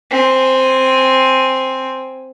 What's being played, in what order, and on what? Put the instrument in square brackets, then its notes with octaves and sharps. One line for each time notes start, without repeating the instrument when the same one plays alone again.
[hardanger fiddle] C4 G#5